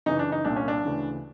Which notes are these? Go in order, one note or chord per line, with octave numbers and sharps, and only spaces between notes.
F#2 C#3 E3 D#4
D4
D#4
C2 A#2 D4
C#4
D4
D2 C#3 E3